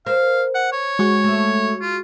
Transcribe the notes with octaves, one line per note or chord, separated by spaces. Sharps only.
A#4 C5 F5
F#5
C#5
G#3 F#4 C#6
A3 E5
F4